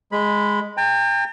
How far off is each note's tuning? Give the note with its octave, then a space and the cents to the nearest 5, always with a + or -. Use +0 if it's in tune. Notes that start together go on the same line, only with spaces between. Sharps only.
G#3 +0 B5 +0
G5 +30 A#5 -45